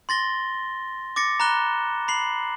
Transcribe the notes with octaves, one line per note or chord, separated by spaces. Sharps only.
C6 A6 A#6 G7
D6 A6 A#6 C#7
A#5 B5 F#6 E7 G7
B5 C7 F#7